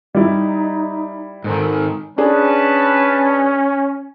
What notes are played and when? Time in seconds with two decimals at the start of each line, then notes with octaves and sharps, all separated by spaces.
0.15 G3 D#4 E4
1.44 G#2 D#3 A4
2.18 C#4 D4 G#4 B4 A5